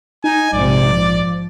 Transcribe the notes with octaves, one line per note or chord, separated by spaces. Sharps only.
D#4 G#5
A#1 G#2 C3 D5
F3